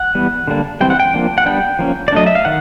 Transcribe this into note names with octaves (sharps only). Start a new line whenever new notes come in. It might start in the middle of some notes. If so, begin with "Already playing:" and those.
Already playing: F#5
E3 G3 B3
D3 G3 A#3 D4
E3 G3 C4 G5
F#5
G5
F3 A#3 D4
F#5
G3 B3 D4 G5
F3 A#3 C#4
D5
F#3 A3 D4 D#5
E5
F5
D#3 F#5